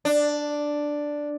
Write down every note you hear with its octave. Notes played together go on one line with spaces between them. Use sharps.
D4